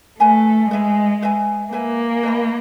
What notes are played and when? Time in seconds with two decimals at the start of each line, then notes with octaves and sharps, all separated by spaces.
0.20 A3 B4 E5 G#5
0.71 G#3 B4 E5 G#5
1.22 B4 E5 G#5
1.72 A#3 B4 E5 G#5
2.23 B4 D#5 G#5 B5